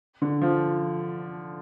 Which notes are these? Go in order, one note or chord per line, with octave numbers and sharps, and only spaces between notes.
D3
F3